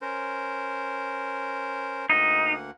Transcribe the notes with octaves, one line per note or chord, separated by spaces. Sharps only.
C#4 A#4 C5
D2 A#3 D#4 F#5